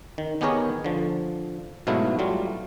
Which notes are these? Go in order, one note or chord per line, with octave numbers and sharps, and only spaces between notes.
D#3
D#3 B3 G4 G#4 A#4 C#5
D3 F3
G#2 B2 F#3 A3 E4 F5
F#3 G3 A3 F4